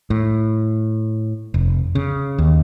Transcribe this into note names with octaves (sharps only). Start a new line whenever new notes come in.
A2
F1
C#3
D#2